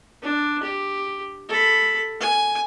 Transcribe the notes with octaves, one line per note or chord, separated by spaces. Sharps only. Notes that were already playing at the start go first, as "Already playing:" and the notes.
D4
G4
A4 B5
G#5